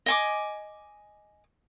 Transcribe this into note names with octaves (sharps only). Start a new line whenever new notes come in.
D#5 G#5 D6